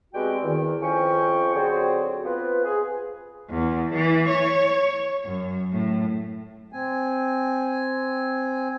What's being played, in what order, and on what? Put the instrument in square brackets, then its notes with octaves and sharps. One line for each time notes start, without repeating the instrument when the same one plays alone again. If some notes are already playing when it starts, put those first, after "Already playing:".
[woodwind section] B2 G3 G#3 C4 F#4 G5
E2 D#3
F2 F3 C#4 G5 C#6
D3 F#3 C4 F#4 G#4 C5
B3 C4 F4 B4
G#4
[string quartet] E2
E3
C#5
F#2
A2
[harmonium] C4 G#5